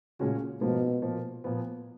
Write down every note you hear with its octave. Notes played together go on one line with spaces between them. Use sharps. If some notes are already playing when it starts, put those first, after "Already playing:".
A#2 C#3 G#3 C#4 F#4
G#2 B2 F3 A#3
A#2 F3 A#3
A#2 F3 B3